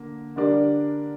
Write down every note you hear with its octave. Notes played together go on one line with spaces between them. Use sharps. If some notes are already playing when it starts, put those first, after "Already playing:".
Already playing: D3 A#3
D3 G3 D4 A#4 D5